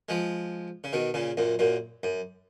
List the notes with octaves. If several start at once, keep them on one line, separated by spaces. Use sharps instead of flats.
F3 G#3
C#3
B2 D#3
A#2 C#3
F#2 A#2
F#2 A#2
F#2